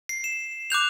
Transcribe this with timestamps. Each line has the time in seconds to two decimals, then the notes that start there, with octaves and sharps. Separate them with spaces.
0.09 C7
0.24 E7
0.70 D6 F#6 G6 F7